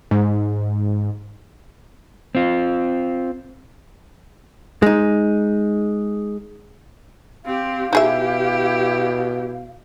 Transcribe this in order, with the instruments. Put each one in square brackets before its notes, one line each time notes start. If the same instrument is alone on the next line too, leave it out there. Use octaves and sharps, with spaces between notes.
[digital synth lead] G#2
[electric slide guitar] C4 F4
[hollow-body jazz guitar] G#3 D#4
[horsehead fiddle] C4 G4 [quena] F5
[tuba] B2 [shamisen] D#4 G#4 E5 [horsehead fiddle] E4 G4